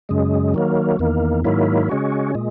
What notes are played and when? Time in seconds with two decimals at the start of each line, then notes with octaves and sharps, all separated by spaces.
0.09 F#2 C#3 G#3
0.54 D#3 F#3 A#3
0.99 E2 D#3 A#3
1.44 G#2 D#3 F#3 A#3 E4
1.89 C#3 G#3 C#4 F#4
2.35 A#2 G#3